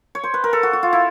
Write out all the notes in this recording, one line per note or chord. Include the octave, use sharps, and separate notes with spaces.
C#5
C5
B4
A#4
A4
F#4
F#4
F4
E4